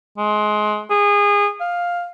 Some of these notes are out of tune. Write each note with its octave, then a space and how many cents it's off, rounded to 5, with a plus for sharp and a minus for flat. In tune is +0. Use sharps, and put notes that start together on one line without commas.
G#3 +25
G#4 -25
F5 +5